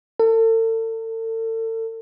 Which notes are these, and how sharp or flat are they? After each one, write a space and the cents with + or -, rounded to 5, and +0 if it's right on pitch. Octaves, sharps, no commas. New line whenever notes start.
A4 +40